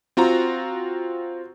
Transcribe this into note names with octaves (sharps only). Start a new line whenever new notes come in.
C4 F4 F#4 A#5